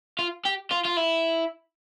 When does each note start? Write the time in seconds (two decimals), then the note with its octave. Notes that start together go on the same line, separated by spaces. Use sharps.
0.19 F4
0.45 G4
0.71 F4
0.85 F4
0.97 E4